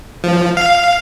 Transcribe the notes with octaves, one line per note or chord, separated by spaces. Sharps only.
F3
F5